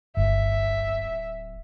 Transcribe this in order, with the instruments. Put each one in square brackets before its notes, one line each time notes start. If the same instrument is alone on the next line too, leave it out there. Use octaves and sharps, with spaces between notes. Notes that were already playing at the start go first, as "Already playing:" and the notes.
[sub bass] D1 [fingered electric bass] G1 [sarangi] E5